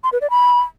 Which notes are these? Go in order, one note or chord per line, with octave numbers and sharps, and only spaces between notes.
C6
B4
D5
B5